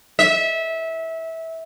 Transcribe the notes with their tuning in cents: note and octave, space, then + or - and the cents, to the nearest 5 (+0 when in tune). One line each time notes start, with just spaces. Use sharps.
E5 -20